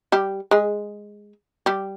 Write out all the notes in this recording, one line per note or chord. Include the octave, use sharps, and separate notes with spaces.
G3 G4
G#3 G#4
G3 G4